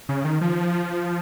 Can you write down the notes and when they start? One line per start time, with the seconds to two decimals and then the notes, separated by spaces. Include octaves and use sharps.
0.09 C#3
0.24 D#3
0.41 F3